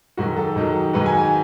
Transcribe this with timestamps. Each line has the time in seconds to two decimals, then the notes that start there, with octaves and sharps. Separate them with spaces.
0.17 G#2 D#3 F#3 F#4
0.37 A4
0.56 G#2 D#3 F#3
0.93 G#2 D#3 F#3 B4
1.06 G#5
1.17 G#5